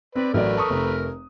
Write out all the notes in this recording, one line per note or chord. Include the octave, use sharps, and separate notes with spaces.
C4 B4 D5
A1 F#3 A3 A#4 B4 D5
A5 C#6 D#6
F1